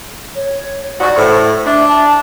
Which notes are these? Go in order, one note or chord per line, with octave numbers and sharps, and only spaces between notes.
C#5
G#2 F#4 D5
A2 C5
D4 E5
A5